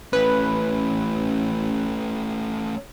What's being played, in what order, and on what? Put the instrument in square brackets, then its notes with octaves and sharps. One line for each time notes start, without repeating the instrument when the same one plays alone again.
[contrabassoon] A1 [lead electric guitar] A3 C#4 [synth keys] B4